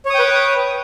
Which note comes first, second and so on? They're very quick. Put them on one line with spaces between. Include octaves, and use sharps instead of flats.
C#5 D#6 G5 B4